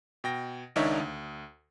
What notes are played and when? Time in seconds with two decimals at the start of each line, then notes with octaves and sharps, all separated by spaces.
0.24 B2 G5 A#6
0.76 C#2 D#3 D4 D#4 C#5 E5
1.00 D2